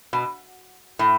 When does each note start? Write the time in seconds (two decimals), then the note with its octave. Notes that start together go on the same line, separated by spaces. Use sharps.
0.13 B2
0.99 A2